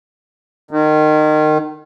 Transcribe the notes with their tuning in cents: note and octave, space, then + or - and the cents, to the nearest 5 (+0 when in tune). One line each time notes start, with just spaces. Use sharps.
D#3 -25